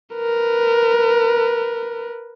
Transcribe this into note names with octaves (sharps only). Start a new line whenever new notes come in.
A#4 B4